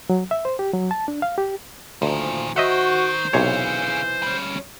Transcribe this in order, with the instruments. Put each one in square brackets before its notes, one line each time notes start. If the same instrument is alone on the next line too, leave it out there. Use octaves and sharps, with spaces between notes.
[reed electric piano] F#3
E5
C5
G4
F#3
A5
D4
F5
G4
[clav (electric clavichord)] D2 [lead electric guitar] A#2 D#3 [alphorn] F3
[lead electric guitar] D#3 [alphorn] F#4 [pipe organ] C5 [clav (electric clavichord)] D#5 E5 F#5
[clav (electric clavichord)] B1 C3 C#5 [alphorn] E3 [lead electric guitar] G#4 F5
[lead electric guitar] G3 C#4